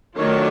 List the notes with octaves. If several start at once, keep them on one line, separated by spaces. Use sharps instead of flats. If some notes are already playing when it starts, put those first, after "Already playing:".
D#3 F#3 A3 D4 F4 C#5